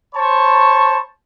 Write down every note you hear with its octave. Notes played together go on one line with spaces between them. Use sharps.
C5 C#5 A5 B5 C#6